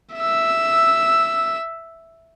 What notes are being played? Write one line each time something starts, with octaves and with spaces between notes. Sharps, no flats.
E5 E6